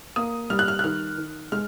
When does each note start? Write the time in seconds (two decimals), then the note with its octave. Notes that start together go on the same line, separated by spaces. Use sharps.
0.16 A#3 D#6
0.50 G3 F6
0.59 F#6
0.68 F6
0.79 F#6
0.84 D#3 F6
1.18 D#3
1.52 G#3 F6